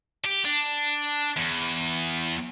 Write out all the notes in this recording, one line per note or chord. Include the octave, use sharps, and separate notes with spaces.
G4
D4
E2